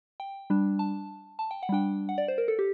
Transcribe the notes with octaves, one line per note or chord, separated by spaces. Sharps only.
G5
G3 D4
A5
A5
G5
F#5
G3 D4 G5
F#5
D5
C5
A#4
A4
G4